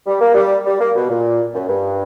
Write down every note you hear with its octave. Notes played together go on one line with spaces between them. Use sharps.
G3
A#3
G3
G3
A#3
B2
A#2
F#2
G2